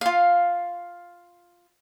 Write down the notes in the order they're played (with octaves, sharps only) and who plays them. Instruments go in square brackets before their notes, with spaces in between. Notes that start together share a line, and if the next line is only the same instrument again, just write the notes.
[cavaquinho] F4 F5